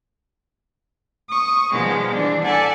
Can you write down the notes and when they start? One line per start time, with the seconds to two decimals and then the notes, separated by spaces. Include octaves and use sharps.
1.28 C#6 D#6
1.70 B2 D#3 F3 G3 G#3 B3
2.13 E3 D4
2.43 A4 D5 E5 F#5 G#5 A5